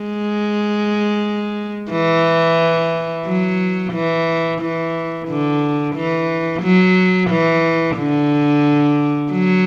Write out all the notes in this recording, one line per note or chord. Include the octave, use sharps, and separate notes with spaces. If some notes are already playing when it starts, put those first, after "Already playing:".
Already playing: G#3
E3
F#3
E3
E3
D3
E3
F#3
E3
D3
F#3